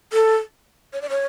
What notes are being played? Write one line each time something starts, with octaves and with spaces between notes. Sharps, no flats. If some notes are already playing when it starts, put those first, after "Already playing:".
A4
C#5
D5
C#5